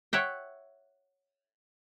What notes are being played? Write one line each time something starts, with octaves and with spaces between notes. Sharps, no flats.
C#5 E5 F#5 G5